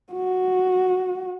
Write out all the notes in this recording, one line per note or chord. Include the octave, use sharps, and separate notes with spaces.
F#4